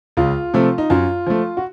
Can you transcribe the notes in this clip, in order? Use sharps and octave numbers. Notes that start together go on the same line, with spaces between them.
C#2 F4
C3 F3 A3
D#4
F#2 F4
F3 A3
F#4